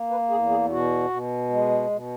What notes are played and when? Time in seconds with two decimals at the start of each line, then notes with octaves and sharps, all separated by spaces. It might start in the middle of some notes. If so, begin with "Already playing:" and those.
Already playing: A#3
0.10 B4
0.30 E2 G#4
0.50 G#4
0.70 B2 F#4
1.10 B2
1.50 G#3
1.90 B2